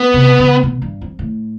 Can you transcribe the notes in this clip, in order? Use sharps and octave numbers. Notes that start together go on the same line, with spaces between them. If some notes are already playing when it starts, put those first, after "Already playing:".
Already playing: B3
C3
C#3
B2
G2
F2
A2